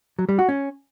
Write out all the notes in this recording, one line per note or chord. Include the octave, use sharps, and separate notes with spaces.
F#3
G3
F#4
C#4